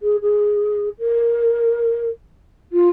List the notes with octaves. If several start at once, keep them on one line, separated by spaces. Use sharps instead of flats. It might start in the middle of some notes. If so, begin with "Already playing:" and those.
G#4
G#4
A#4
F4